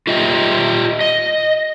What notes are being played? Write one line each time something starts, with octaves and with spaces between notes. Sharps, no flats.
F4 G4 D#5 E5 G5
D#5